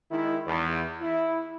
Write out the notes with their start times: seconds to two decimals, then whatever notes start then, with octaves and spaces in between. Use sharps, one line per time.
0.11 D#3 G#3 E4
0.46 E2
1.01 E4